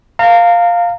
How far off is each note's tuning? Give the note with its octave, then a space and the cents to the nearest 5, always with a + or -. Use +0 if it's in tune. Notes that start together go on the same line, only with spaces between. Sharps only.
F5 +0 A#5 -35